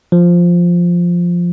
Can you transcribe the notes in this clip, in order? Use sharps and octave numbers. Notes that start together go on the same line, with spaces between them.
F3